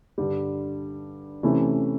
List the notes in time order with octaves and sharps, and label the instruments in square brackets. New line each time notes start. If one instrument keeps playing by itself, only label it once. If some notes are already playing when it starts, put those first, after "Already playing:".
[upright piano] G2 D3 G3
C3 E3 A3 C#4 E4